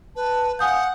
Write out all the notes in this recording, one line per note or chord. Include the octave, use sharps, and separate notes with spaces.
B4 A5
F5 F#5 G#5 D#6 G6